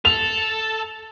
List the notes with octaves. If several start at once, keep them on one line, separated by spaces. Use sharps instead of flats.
A4 F7